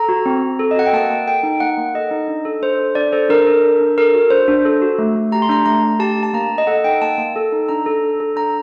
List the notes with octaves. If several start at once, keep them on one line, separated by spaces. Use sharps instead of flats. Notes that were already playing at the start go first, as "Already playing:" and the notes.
Already playing: A4 A#5
F#4
C4
C4
A4
D#5
F#4 F#5
G5
A#3 A5
A#3
A4 G5
D#4
A#3 F#5
A#3
A4 D#5
D#4
D4
A4
D4 C5
A4
D4 D5
A4 C5
D4 A#4
A4
D4
D4
A4 A#4
F#4
D4 C5
D4
A4
F#4
A3
A3
G4 A#5
C6
D4 A#5
A3 A#5
A3
G4 A5
D4
A5
A#3 A#5
A#3
D#5
A4 F#5
D#4 G5
A#3 A5
A#3
A4
D#4
D4 A#5
A4
D4
A4
D4 A#5